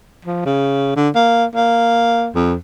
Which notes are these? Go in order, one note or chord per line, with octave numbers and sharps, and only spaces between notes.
F3
C#3
D3
A#3
A#3
F2